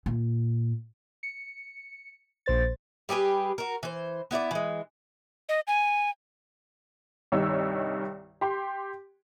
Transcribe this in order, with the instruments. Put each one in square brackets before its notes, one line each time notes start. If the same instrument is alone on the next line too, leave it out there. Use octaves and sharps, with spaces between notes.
[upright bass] A#2
[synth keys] C#7
A#1 C5 A6
[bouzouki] G3 G4 G#4 B4
F#4 A#4
E3 C5
B3 E4 G#4 D5
E3 G#3
[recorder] D#5
G#5
[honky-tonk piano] C2 G2 D#3 C#5 E6
G4 C6